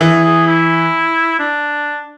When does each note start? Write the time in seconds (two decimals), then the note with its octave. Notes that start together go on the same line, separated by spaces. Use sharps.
0.01 E3 G#4
0.24 G#4
0.47 E4
1.39 D4